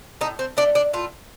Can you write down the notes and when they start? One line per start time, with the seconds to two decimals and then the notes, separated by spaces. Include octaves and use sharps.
0.21 A2 D#4
0.39 C4
0.57 A3 D4
0.75 D4
0.93 A2 F4